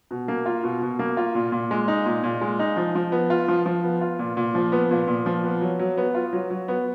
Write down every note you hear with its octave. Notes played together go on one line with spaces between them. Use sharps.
B2
A#3
F4
B2
B2
A#3
F4
A#2
A#2
G#3
D#4
A#2
A#2
G#3
D#4
F3
F3
B3
F4
F3
F3
B3
F4
A#2
A#2
F3
B3
A#2
A#2
F3
B3
F#3
F#3
B3
F4
F#3
F#3
B3